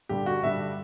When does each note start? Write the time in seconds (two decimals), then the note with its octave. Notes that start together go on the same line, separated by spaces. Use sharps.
0.09 G2 D3 G3 G4
0.26 F#4
0.43 G2 D3 G3 E5